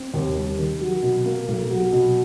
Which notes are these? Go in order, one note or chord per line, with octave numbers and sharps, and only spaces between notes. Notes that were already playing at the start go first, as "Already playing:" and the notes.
Already playing: C4
D#2
G3
D#3
F#3
B2
A#3
B1
F#3
B2